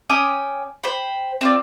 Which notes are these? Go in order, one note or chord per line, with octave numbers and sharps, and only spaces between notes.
C#4 G5 D6 D#6
C5 G5 B5
C4 F4 D5